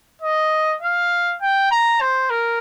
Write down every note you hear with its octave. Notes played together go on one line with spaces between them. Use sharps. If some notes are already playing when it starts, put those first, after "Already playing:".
D#5
F5
G5
A#5
C5
A#4